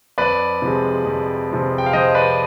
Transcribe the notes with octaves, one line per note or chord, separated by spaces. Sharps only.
F2 B4 D5
C3 F3 G#3
F2
C3 F3 G#3
G5
F5
F2 C5 D#5
B4 D5